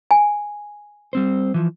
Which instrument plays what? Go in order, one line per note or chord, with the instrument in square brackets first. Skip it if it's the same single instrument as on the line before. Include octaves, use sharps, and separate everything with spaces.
[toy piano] G#5
[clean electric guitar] G3 C4 C5
E3 F3